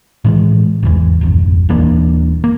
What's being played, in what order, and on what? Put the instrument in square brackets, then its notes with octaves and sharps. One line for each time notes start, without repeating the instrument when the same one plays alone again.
[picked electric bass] A2 E3 G3 G#3
G#1 E2 E3
D1 G#1 F2
D#1 E3 A#3 D4
A#3